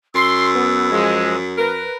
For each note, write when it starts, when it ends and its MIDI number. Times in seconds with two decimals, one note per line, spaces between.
0.15 1.87 42
0.15 0.47 84
0.15 1.37 88
0.55 0.90 59
0.91 1.36 53
0.91 1.36 56
1.57 1.97 70
1.57 1.97 71